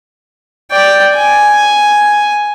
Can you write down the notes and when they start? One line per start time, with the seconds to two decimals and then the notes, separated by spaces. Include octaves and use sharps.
0.72 D5 G5
1.15 G#5